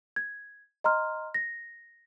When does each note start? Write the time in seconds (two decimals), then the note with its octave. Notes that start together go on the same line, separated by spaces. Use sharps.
0.16 G#6
0.84 D#5 A#5 C6 F6
1.34 A#6